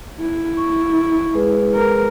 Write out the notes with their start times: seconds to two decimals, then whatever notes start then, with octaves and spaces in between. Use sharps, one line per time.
0.21 E4
0.57 C#6
1.34 G#3 G#4 B4
1.75 A#4